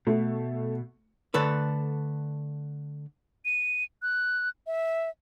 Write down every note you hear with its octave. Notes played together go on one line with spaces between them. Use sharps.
B2 A3
D3 A3 A4 B4
D#7
F#6
E5